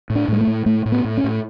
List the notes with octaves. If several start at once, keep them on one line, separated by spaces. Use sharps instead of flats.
A2
D4
A2 G#3
A3
A2
A2 A3
A2
B3
A2
C#4
A2